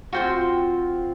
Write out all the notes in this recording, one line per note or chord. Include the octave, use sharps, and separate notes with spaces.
C4 F4 F#4 G5 C6